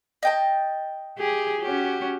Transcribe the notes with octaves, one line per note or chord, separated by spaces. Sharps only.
D#5 G5 A5
G4 G#4
C#4 F#4 G4